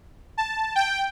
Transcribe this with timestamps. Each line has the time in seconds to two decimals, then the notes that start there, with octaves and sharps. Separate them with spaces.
0.38 A5
0.76 G5